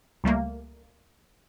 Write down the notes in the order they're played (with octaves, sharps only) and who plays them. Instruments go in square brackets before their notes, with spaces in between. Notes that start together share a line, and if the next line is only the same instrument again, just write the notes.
[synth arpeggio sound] C#2 G3 A3 A#3